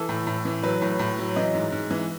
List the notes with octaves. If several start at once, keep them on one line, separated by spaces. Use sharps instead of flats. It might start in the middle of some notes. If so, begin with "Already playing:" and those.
Already playing: E3 A4
A2
A2
E3
F#3 B4
A2
A2
F#3
E3 D#5
G#2
G#2
E3